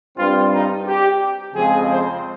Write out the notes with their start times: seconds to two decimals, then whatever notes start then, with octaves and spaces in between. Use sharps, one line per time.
0.17 G2 G3 C4 F4
0.52 D#4
0.87 G4
1.54 F2 C#3 F3 G#3 C4 G#4
1.90 C5